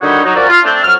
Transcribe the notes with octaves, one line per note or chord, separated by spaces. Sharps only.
D3 D#3 G3 D#4 F#4 C#5
F#3 D#4
F3 G3 C#4 F#4 A#4 D5
F4
A3 C4 D4
F2 F#3 F6